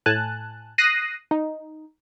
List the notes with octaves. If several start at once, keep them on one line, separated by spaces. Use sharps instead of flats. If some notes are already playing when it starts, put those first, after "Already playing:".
A2 G#5 A5 F#6
D#6 F#6 A#6 C7 D#7
D#4